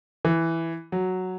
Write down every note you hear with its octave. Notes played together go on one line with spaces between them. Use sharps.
E3
F#3